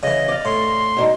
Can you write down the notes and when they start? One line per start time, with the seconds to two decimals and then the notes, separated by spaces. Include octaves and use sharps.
0.03 C#3 E3 D#5
0.28 D5 F5
0.45 A2 C6
0.97 B2 D4 D#4